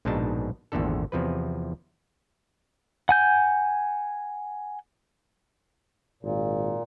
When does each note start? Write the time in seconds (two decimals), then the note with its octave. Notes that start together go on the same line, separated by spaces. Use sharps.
0.05 A#1 G#2 B2 D4 D#4 A5
0.72 G#1 E2 A#2 D3 A4
1.12 E2 C3 F3 B4
3.09 F#5 G#5 G6
6.23 G#1 A#2